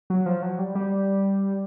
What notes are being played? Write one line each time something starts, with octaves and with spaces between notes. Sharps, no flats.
F#3
F3
F#3
G3
G3